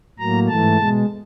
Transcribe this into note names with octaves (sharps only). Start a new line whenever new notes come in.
A2 F#3 A#3 A#5
G#2 E3 A3 A5
B2 G#3